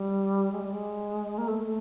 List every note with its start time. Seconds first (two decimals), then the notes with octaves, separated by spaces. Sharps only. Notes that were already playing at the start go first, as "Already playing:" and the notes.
Already playing: G3
0.52 G#3
0.63 G3
0.72 G#3
1.38 A#3
1.48 A3
1.64 A3